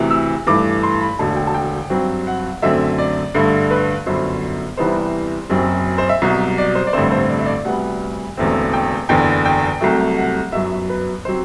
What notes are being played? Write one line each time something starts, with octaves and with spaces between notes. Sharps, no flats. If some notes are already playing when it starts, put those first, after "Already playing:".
Already playing: D2 C3 E3
E6
G2 E3 A3 D6
C6
B5
E1 D2 D3 A5
G5
A5
G5
G2 F#3 C4
F#5
F#2 D3 A3 C4 E5
D5
G2 D3 A3
B4
G1 F#2 D3 C5
C2 C3 E3 G3 B3 C5
F#1 F#2 F#3 C4
C5
E5
C2 B2 F#3
D5
C5
D5
A1 G2 D3 A3 C4 C5
C5
D5
E5
D5
D2 C3 G3 B3 F#5
E1 E2 D3 A3 C4
G5
F#1 E2 D3 G5
G5
C2 C3 F#3 A3
F#5
G1 F#2 F#3 E5
B4
F#3 C4 C5